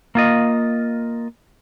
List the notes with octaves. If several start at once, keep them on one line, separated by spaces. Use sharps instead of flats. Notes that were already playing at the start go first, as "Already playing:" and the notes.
A#3 F4 D#5